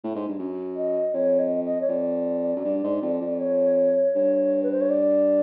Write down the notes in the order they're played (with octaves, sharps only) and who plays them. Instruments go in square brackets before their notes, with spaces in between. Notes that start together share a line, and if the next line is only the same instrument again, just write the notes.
[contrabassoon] A2
G#2
G2
F#2
[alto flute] D#5
[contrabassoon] F2 [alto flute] C#5
[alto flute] D#5
D#5
C#5
[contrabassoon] F2 [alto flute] D5
[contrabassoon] F#2
G2
G#2
F2
F2
[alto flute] C#5
[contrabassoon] G2
[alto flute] B4
C5
C#5
D5